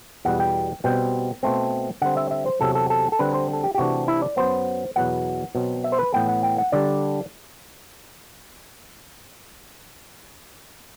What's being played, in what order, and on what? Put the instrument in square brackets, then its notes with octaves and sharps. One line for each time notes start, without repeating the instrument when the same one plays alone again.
[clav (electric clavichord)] E2 B2 G3 F#5
G5
B2 G3 C4 G5
B2 A3 C4
D3 G3 C4 F#5
E5
E5
C5
E2 C3 F#3 A4
A4
A4
A4
D3 G3 C4 B4
C5
A4
G4
G4
C3 E3 A3 D4 F#4
E4
D5
F#2 F#3 B3 C5
E2 B2 F#3 B3 F#5
B2 F#3 C4
E5
C5
B4
A2 E3 B3 G5
F#5
G5
F#5
D3 G3 D4 D5